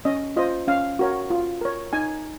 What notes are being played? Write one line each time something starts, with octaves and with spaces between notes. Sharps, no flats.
C#4 D#5
F4 C5 D#5
C#4 F5
F#4 A#4 C#5
F4
A#4 C#5
D#4 G#5